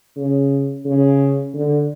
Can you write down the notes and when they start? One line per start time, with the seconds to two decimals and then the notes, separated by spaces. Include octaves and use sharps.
0.16 C#3
0.85 C#3
1.54 D3